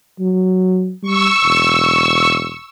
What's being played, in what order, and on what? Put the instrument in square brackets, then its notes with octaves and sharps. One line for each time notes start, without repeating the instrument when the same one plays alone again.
[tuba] F#3
[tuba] G3 [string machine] C#6 E6
[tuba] E1